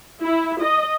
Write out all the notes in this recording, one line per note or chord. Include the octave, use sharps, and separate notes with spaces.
E4
D#5